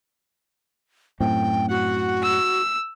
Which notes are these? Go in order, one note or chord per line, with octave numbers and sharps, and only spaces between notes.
F#2 A2 C4 G5
F#4 F#5
E6